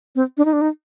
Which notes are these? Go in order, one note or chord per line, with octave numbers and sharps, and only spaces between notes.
C4
D4
D#4
D4
D#4